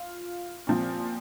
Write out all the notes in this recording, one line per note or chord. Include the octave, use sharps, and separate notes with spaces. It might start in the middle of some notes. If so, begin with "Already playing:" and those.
Already playing: F4
A#2 F3 C4